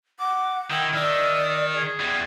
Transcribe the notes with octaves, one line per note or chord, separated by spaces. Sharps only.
F#5 D6
D#3 E4 G5
D#3 D5 E5
G#4
E2 G3